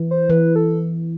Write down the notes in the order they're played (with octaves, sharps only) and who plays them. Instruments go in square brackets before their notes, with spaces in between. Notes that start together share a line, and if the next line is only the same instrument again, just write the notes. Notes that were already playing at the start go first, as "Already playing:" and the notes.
Already playing: [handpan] E3
[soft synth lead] C5
[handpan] E3 [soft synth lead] B4
[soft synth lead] A4